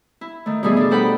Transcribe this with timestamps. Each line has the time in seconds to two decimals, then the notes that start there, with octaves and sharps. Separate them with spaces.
0.21 E4
0.46 D#3 A3
0.63 B2 E3 G3 A3 B3 G#4
0.77 D4 A4
0.90 D#4 A4 C5 F#5 G5 B5